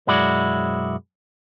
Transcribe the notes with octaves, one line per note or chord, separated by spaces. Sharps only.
B1 F#2 G#3 E4 F#4 D5